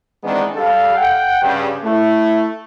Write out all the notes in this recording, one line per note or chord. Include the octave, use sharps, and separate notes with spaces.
D#3 E3 G#3 B3 C4 D4
G3 A4 F5
F#5 G5
G2 C#3
A3 E4